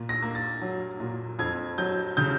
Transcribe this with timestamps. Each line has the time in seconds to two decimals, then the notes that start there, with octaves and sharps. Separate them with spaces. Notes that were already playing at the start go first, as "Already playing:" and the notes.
Already playing: A#2
0.09 A#6
0.22 A#3
0.35 A6
0.61 F#3
1.00 A#2
1.39 F2 G#6
1.78 F#3 G6
2.17 C#3 G6